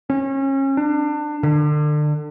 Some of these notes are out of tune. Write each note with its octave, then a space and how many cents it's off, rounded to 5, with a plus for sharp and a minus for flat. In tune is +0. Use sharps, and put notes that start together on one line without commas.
C#4 -30
D4 +25
D3 +30